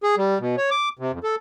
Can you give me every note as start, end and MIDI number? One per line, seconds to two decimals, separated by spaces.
0.03 0.15 68
0.18 0.38 55
0.40 0.56 47
0.57 0.70 73
0.71 0.89 86
0.99 1.12 48
1.12 1.19 41
1.24 1.35 69